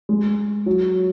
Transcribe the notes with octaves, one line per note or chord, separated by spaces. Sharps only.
G#3
F#3